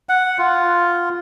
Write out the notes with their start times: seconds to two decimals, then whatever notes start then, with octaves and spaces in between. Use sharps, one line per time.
0.09 F#5
0.38 F4